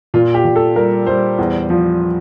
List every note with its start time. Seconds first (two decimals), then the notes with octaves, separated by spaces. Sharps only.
0.14 A#2 F4
0.34 G4
0.45 A#2
0.56 A4
0.76 G3 A#4
1.07 G3 C5
1.38 E2
1.70 F3